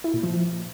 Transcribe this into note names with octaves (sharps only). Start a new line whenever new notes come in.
E4
A#2
F3